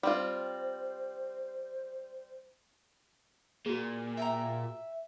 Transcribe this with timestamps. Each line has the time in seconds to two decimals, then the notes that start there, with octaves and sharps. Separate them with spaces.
0.03 G3 C4 F4 C5
3.66 A#2 F#4 G#4
4.17 E5 G5 A#5